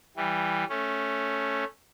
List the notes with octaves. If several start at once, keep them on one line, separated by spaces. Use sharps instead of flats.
E3 G3
A3 C#4